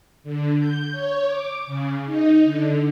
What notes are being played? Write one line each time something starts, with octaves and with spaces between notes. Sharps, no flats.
D3
G6
C#5
D6
C#3
D#4
D3